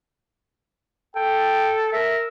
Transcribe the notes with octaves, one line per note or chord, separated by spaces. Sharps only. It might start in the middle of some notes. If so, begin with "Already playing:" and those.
A4 G5
A#4 E5